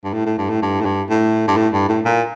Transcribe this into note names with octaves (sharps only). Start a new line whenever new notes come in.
G2
A2
A2
G2
A2
G2
A2
G2
A2
G2
A2
G2
A2
A#2